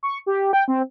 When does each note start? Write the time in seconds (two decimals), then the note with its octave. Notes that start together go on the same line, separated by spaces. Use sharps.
0.03 C#6
0.26 G4
0.53 G5
0.68 C4